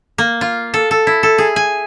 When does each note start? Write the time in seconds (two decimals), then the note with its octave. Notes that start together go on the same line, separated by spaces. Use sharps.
0.18 A#3
0.41 F4
0.74 A4
0.91 A4
1.07 E4
1.23 A4
1.38 G#4
1.56 G#5